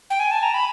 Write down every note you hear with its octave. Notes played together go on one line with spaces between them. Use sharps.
G5
G#5
A5
A#5
B5